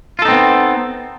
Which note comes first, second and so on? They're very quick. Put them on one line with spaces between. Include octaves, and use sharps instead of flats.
F4 A4 D#4 C4 B3